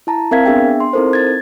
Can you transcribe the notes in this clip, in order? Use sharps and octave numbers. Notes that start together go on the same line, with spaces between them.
E4 A5 A#5
C4 A#4 E5 F5 G#6 B6
B3 D4 G#4 E5 G5
C6
C4 D#4 E4 A4 A#4 C5
G#6 A6